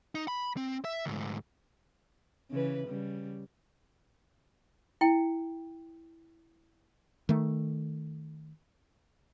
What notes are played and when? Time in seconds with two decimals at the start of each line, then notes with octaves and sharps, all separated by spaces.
0.15 D#4
0.28 B5
0.57 C4
0.85 E5
1.06 D2 G#2
2.51 C#3 E3 B4
2.87 C#3 G3
5.01 E4 G5
7.29 D#3 A3